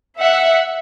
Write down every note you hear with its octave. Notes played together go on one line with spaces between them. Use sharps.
E5 F#5